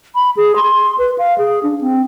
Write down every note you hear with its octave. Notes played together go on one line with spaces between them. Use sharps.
B5
G#4
C6
B4
F5
G#4
D4
C4